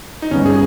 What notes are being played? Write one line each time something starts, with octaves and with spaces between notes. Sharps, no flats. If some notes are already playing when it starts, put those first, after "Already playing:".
D#4
G1 G2 G3 C#4
G#4